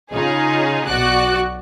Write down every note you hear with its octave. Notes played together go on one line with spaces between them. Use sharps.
C#3 D#4 F4 G#4
B1 F#4 D5 F#6